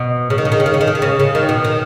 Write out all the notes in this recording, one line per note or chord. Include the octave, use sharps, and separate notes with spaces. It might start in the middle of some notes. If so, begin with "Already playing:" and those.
Already playing: B2
C#3
D#3
C#3
D#3
C#3
D#3
C#3
D#3
C#3
D#3
C#3
C#3
D#3
B2
D#3